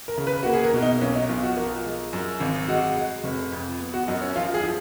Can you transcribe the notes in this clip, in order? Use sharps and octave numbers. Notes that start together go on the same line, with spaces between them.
A#4
C#3
B4
A#3 F#4
G#4
A#4
B2
D#4
B1 C#4
D#4
B1 F4
F#4
F3 A#4
G#3
F#2
G#1
G#3 F#4
G#3
F1
F2
B3
F#4
F#2 D#4
C#4
F3 F4
G#4
F3